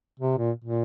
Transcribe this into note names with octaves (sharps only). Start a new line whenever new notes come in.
C3
A#2
A#2